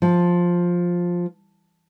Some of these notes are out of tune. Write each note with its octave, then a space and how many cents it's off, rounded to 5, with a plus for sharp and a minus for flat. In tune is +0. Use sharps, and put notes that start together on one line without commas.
F3 +10